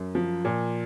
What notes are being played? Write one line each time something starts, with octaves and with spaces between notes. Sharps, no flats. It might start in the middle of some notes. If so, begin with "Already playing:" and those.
Already playing: F#2
F3
A#2